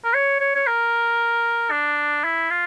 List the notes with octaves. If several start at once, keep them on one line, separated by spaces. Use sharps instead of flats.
A#4
C#5
C#5
C#5
A#4
D4
E4
F4